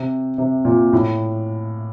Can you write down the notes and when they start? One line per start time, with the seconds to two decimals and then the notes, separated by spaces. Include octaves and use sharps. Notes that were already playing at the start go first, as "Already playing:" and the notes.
Already playing: C3
0.38 C3
0.65 A#2
0.93 A2